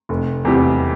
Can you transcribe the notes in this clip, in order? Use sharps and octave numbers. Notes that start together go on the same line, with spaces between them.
F1
E2 C3 G3